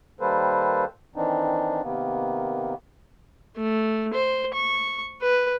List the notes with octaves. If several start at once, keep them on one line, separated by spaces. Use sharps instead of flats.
D#3 G3 A#3 A4 B4 C5
D#3 E3 C4 D4 D#4
C3 D#3 A#3 B3
A3
C5
C#6
B4